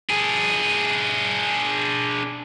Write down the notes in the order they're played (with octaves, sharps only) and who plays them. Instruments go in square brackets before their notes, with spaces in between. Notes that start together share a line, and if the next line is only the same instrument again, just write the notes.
[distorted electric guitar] D4 G#4